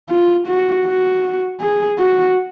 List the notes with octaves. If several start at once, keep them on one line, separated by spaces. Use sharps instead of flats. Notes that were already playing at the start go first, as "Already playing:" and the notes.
F4
F#4
F#4
G#4
F#4